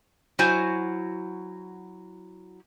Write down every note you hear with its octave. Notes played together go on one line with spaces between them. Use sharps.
F#3 E4 F#4 C5 G#5